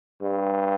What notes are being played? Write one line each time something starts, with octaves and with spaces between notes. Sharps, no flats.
G2